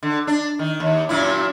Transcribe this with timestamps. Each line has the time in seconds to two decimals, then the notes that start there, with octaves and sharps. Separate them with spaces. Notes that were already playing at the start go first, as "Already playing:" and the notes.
0.03 D3
0.27 D4
0.59 D#3
0.80 D#2
1.09 F#2 A#2 E4